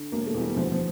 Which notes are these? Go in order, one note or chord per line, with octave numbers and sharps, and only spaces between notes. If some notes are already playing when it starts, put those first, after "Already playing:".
Already playing: D3
E1 A#3
A3
E2
G3
D2 F3
F3